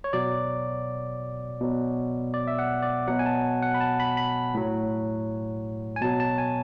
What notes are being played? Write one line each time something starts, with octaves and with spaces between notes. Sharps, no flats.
C#5
B2 F#3 D5
B2 F#3
D5
E5
F#5
D5
B2 F#3 F#5
G#5
A5
F#5
B5
A5
B5
B5
A2 F#3
G#5
B2 F#3 A5
A5
G#5